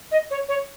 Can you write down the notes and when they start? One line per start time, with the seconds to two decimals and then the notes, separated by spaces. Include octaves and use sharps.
0.12 D#5
0.31 C#5
0.49 C#5